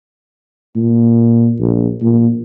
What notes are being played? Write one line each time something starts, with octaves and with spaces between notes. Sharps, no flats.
A#2
A#1
A#2